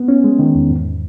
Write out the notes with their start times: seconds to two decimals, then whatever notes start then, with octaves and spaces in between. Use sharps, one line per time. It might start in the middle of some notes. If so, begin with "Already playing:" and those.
Already playing: B3
0.08 C#4
0.24 G#3
0.39 D#3
0.55 E2
0.71 G#2